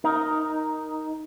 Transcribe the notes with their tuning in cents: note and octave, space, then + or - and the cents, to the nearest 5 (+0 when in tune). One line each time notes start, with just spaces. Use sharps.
D#4 +0 A#4 +0